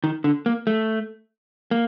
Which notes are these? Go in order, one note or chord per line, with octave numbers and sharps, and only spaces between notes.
D#3
D3
A#3
A3
A#3